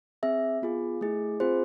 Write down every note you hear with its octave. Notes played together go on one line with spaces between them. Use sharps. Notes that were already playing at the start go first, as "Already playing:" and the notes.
C4 G#4 E5
B3 F4 G#4
A3 E4 G#4
C4 F4 G#4 C5